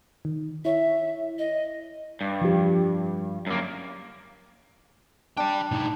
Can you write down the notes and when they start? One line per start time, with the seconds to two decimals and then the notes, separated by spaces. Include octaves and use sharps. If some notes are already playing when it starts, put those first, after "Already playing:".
0.25 D#3
0.65 E4 C#5 E5
1.39 D#5
2.21 G2
2.41 F3 G4
3.47 F#2 A#3
5.37 D4 D5 G5
5.71 A2 D#4